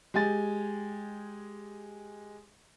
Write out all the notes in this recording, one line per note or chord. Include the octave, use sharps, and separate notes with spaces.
G#3 G4 G#5 A6